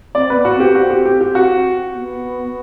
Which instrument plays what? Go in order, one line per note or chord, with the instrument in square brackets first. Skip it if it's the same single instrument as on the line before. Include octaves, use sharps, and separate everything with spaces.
[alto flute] C4 [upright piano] D5
[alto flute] B3 [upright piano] B4
[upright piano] F#4
[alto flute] C4
[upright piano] G4
[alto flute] C4 [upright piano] F#4
[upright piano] G4
G4
G4
F#4
[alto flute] B3